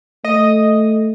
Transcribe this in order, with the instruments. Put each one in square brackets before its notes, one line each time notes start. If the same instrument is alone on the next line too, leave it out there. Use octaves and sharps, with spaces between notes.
[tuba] A3 [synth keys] D#5